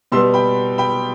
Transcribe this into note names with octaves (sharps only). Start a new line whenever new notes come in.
B2 G3 B3 C6 E6
G5 B5
G5 B5